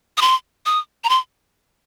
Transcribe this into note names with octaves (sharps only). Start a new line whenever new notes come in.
D#6
C6
D#6
A#5
C6